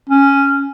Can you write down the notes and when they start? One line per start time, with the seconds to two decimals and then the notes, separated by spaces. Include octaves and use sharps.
0.10 C#4